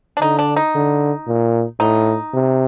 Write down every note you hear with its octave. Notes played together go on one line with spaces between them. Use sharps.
D4
D3 D#4
D4
D#4
D3
A#2
A2 D#4
C3